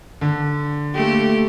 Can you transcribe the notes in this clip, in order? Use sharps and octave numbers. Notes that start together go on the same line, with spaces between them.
D3
A3 A#3 G4